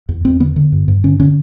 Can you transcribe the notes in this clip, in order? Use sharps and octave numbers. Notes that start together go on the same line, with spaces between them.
E2
E2 C4
D3 B3
D3
G2
G2
D3 C#4
D3 C#4